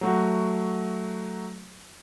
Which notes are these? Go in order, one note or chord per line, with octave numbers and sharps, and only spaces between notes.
F#3 A3 F#4